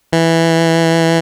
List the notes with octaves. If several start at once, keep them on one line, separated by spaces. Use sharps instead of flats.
E3